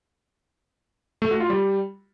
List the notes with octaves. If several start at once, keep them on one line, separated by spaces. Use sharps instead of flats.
A3
F#4
F4
G3